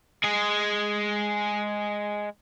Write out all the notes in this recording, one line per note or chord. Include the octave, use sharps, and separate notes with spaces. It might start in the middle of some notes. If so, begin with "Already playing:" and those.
G#3 G#4